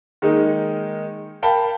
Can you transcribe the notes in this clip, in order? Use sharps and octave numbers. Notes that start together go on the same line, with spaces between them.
D#3 G#3 A#3 D#4
A#4 F5 G5 A5 B5